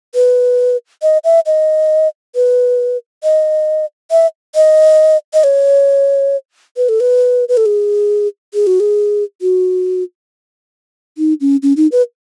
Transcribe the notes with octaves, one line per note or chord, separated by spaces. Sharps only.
B4
D#5
E5
D#5
B4
D#5
E5
D#5
D#5
C#5
B4
A4
B4
B4
A4
G#4
G#4
F#4
G#4
F#4
D#4
C#4
C#4
D#4
B4